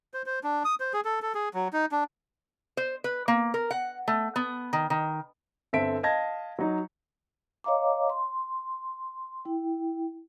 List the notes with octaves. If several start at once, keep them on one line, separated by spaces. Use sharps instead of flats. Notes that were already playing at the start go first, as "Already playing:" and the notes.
C5
C5
D4
D#6
C5
G#4
A4
A4
G#4
F#3
D#4
D4
C5
B4
A#3
A#4
F#5
A3
B3
D#3
D#3
G1 C4 A4 E5 B6 D7
D#5 F5 A5 G#6 A#6
F#3 D#4
C#5 D#5 F5 A#5 D6
C6
E4 G5